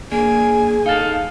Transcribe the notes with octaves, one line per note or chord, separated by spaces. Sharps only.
A#3 D4 G#4 G#5
D#4 A4 F5